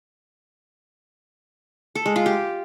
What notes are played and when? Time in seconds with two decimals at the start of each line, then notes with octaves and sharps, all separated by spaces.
1.95 A4
2.06 G#3
2.16 F4
2.26 G4